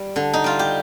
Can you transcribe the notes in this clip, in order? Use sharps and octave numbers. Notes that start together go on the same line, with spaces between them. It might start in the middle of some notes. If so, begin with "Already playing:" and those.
Already playing: G3
D3
D#4
G3 F4
G4